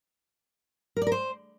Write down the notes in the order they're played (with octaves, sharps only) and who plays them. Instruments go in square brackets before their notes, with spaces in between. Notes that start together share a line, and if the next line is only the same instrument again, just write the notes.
[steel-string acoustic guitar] A#4
D5
A#4
C5